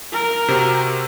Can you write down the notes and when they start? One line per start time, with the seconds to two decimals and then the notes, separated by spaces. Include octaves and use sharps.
0.13 A#4
0.48 C3 C4 F#4